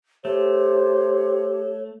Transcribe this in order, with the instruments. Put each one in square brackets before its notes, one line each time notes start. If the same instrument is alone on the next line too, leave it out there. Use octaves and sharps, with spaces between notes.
[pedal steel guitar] A3 [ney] G4 [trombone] C5 [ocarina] C#5